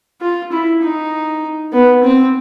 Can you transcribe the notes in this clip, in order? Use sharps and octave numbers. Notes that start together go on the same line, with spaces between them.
F4
E4
D#4
B3
C4